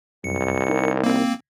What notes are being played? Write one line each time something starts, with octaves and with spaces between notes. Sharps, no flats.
C2 F#2 C#7
D#4 G4 A#4
A#3 C4